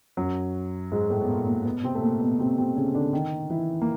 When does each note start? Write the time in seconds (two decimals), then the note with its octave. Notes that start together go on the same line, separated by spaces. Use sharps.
0.17 F#2 F#3
0.92 G#2 G#3
1.10 A2 A3
1.21 B3
1.28 A#2 A#3
1.47 A#2 A#3
1.65 B2 B3
1.84 C3 C4
1.95 A3
2.02 A#2 A#3
2.20 B2 B3
2.40 C3 C4
2.58 C3 C4
2.76 C#3 C#4
2.95 D3 D4
3.13 D#3 D#4
3.50 E3 E4
3.82 A#3